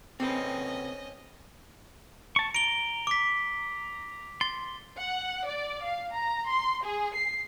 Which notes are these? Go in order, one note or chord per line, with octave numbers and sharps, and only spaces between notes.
C3 C4 C#4 A4 B4 D#5
A5 C#6
A#5 D7 G7
D6 B6
C6 A6
F#5
D5
F5
A#5
C6
G#4
C7